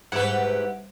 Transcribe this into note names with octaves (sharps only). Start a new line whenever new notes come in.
G#2 E4 G4 B4 F#5